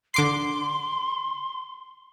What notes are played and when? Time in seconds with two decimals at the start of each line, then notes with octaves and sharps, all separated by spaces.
0.14 D3 C6 D6 C7